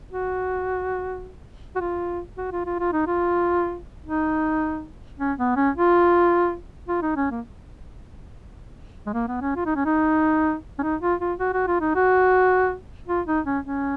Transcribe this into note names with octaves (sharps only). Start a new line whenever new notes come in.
F#4
F#4
F4
F#4
F4
F4
F4
D#4
F4
D#4
C#4
B3
C#4
F4
F4
D#4
C#4
A#3
G#3
A#3
B3
C#4
F4
D#4
C#4
D#4
C#4
D#4
F4
F4
F#4
F#4
F4
D#4
F#4
F4
D#4
C#4
C#4